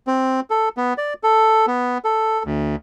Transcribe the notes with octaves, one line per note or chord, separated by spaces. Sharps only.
C4
A4
B3
D5
A4
B3
A4
D2